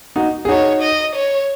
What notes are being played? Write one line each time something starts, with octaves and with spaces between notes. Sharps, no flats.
D#4 F#4
G#4
D#4 F#4 C#5
D#5
C#5